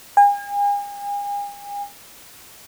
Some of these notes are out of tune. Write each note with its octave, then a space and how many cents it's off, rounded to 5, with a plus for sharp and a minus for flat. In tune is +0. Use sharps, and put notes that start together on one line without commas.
G#5 -40